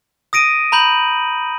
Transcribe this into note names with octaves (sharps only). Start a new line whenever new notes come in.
D#6 A#6 D7 D#7
A#5 B5 G6 F#7